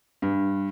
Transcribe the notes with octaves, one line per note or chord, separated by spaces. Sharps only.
G2